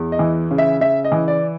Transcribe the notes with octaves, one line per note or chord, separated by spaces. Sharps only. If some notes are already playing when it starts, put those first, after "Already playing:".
Already playing: E2
D#5
E3
C#3
E5
C#3 E5
D#5
E3
D5